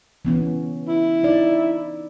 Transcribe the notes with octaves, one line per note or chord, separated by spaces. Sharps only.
E3 B3 C#4
E4
D#4 D5